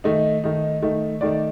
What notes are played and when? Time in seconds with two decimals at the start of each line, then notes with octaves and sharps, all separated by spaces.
0.04 D#3 A3 D#4 D#5
0.44 D#3 A3 D#4
0.82 D#3 A3 D#4
1.21 D#3 A3 D#4 D5